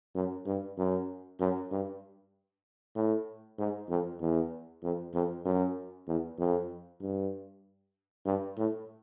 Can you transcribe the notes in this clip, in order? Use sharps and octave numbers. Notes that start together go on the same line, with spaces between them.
F#2
G2
F#2
F#2
G2
A2
G#2
F2
E2
F2
F2
F#2
E2
F2
G2
G2
A2